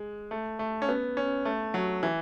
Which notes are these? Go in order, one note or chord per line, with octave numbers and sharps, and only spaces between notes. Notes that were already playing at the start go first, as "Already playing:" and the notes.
Already playing: G#3
A3
A3
C#4
B3
C#4
A3
F#3
E3